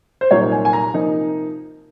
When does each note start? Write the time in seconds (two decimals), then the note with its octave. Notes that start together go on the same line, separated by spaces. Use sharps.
0.21 C5
0.31 C2 A#2 F#3 A#3 D#4 C#5
0.52 G#5
0.65 G#5
0.73 A#5
0.94 C3 F3 A#3 D#4